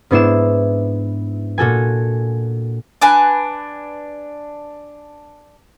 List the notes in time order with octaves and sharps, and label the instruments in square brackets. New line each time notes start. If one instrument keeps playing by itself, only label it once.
[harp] G#2 B3 D4 E4 C7 E7
A#2 F#4 A4 G#5
[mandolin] D4 B4 G#5 F#6